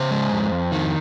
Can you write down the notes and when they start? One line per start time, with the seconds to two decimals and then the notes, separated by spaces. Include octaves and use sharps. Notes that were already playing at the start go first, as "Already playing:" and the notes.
Already playing: C#3 C5
0.11 G#3
0.31 F2
0.52 F2
0.72 D#3